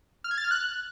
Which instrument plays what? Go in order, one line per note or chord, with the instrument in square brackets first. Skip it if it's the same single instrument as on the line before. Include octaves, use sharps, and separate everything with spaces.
[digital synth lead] F6
G#6
A6
F6
F#6